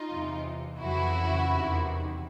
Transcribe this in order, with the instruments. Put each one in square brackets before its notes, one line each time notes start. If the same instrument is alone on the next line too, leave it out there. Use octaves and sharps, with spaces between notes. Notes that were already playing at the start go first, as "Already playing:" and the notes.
Already playing: [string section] D#4 F4
E2 C3 E3
F2 C#3 E3 E4 F#4
E2 C3 D#3